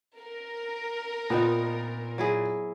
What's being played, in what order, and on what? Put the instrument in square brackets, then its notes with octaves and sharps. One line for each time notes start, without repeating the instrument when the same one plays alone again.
[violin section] A#4
[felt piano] A#2 [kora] B3 C4 D#4
[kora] F#3 E4 G#4